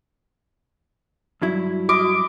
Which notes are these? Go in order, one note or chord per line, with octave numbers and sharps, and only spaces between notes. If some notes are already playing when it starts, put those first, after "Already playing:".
G2 F#3 E4
F#4 D#5 D6